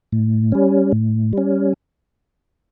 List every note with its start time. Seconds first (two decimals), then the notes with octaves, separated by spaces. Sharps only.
0.12 A2
0.52 G3 C#4
0.92 A2
1.33 G3 C#4